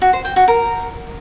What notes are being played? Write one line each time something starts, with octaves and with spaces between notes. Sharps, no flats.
F#4
C5
G5
F#4
A#4